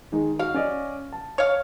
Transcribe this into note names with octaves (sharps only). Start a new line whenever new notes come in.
D#3 G#3 D#4
F#4 F5
C#4 D5 D#5
A5
C#5 F5